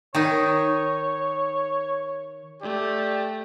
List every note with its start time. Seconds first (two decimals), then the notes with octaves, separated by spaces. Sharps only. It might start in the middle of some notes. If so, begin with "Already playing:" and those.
0.15 D#3 D#4 C#5
2.62 A3 G4 D5